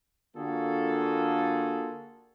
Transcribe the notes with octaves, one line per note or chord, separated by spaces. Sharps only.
D3 A#3 F4 F#4 G#4 A4